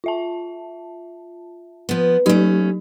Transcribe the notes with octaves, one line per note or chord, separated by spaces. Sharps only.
F4 E5 A5
F3 B3
F#3 A3 C#4 D#4 G4